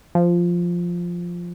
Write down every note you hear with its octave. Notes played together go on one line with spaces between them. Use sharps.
F3